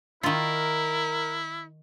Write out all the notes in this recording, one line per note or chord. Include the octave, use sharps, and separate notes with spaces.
D#3 E4 F4 A#4